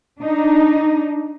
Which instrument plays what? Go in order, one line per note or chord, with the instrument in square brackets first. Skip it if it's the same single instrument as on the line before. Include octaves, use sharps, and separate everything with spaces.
[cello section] D4 D#4